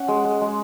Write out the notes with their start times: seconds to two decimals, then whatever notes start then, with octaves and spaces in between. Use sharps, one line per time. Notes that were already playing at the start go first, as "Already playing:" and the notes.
Already playing: C#4 F#5
0.08 G#3
0.25 G#3
0.41 G#3